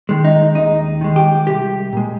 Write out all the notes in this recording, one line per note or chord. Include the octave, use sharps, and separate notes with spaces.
D#3 G#3
D#4
D#2 D#4
D#3 G#3
G4
C2 G4
A#2 G#3